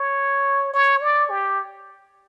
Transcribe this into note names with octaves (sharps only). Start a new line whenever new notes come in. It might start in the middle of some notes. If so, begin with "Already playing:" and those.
Already playing: C#5
C#5
D5
G4